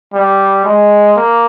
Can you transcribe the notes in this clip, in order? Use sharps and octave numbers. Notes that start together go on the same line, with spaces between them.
G3
G#3
A#3